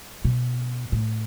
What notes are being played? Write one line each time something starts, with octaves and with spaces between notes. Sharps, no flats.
B2
A2